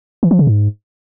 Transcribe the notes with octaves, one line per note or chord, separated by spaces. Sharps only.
E3
F3
C#3
G#2